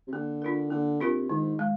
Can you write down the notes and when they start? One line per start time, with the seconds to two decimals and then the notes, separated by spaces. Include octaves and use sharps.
0.07 C3
0.13 D3 A#3
0.42 D4 F4 A#4
0.70 D3 A#3
1.00 C3 D4 F4 A#4
1.29 G#2 D#3
1.59 G#3